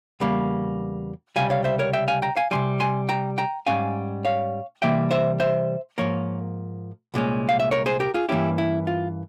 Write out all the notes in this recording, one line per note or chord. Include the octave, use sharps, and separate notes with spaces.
E2 C#3 G3 A#3
C#2 C3 G3 F5 G#5
C#5 F5
C5 E5
A#4 C#5
E5 G5
F5 G#5
G5 A#5
F5 G#5
C3 E3 G3 G#5 C6
G#5 C6
G5 A#5
G5 A#5
G#2 G3 C#4 F5 G#5
C#5 F5
C3 E3 G3 A#3 E5 G5
C5 E5
C5 E5
G#2 F3 A#3 A#4 C#5
C2 A#2 G#3 C#4
F5
E5
A#4 C#5
G#4 C5
G4 A#4
F4 G#4
G2 E3 A#3 C#4 E4 G4
E4
F4